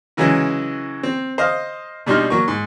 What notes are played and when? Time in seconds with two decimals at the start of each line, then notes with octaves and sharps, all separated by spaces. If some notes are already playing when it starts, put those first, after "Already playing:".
0.17 C#3 E3 F#3 G#3 C#4 E4
1.03 C4
1.38 C5 D#5 F5
2.06 B2 G3 D4 D#4 C6 F6
2.30 F#3 A#3 C#6
2.48 G#2